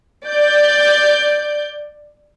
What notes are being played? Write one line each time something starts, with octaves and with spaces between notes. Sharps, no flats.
D5 G6